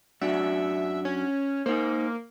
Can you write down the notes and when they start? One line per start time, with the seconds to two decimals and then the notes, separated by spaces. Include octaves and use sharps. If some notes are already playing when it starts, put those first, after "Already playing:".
0.21 F#2 D4 F#4 E5
1.05 C#4
1.66 A#3 D#4 C5